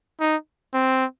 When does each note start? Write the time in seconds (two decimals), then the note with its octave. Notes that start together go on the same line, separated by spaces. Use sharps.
0.20 D#4
0.74 C4